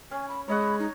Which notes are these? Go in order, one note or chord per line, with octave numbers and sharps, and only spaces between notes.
C#4 G#5
B5
G#3 C#5 D#5 F#5 B5
D#4